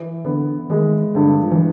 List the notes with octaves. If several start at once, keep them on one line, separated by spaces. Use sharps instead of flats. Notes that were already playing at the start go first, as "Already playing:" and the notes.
Already playing: E3
D3 B3
D#3 G#3
G2 D3
F3
E3